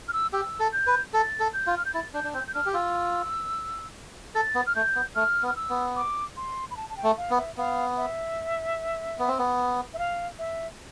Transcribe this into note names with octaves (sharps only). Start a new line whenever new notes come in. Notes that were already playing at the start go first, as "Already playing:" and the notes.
F6
E6
G4 E6
A4
G6
B4
A4 A6
A4
G6
F4
F6
G6
E4 A6
D4 G6
D4
C4 G6
G6
D4 F6
G4
F4 E6
A4 A6
B3
F6
A3 G6
B3
A3 F6
B3
F6
E6
B3
D6
C6
B5
A5
A5
G5
A3
F5
B3
E5
B3 F5
E5
B3
C4
B3
E5
F5
E5